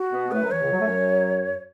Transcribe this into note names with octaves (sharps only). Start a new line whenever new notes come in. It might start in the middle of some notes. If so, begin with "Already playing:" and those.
Already playing: F#4
B2 B3
B3
A2 A3 B4
F#2 F#3
E2 E3 C#5
C#2 C#3
F#3
A3
F#2 F#3